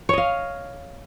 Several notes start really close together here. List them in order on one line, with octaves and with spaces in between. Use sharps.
C#5 D#5 F5